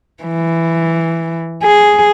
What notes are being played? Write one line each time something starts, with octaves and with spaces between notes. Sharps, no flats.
E3
G#4